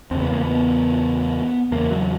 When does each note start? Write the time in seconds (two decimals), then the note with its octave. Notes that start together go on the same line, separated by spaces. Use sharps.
0.11 E2 C#3 C4
0.21 B3
0.32 A#3
0.41 B3
1.72 E2 C#3 A#3
1.91 F#3